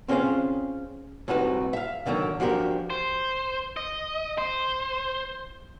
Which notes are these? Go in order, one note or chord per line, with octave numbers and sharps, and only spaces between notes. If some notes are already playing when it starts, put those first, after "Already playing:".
C4 C#4 F4 G#4 C5 F5
C2 A2 C3 D#4 F#4 B4
E5 F5
A2 D3 D#3 F3 F#3
F3 D4 F#4 G4 A#4
C5
D#5
C5